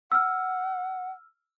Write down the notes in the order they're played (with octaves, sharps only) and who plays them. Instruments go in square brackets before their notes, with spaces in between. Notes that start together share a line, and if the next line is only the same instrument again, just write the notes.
[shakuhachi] F#5 [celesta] E6 F6